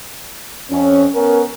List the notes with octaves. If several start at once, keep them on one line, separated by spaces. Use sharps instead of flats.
F2 C#4
B3 C#4 A#4